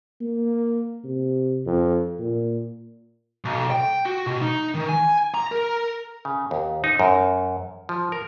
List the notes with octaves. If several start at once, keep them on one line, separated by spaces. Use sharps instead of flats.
A#3
C3
F2
A#2
B1
G5
F#4
B2
D#4
D#3
G#5
A#5
A#4
C#3
D#2
D#4
F#2
F3
A#4